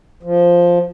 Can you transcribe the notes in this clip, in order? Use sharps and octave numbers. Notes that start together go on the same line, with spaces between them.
F3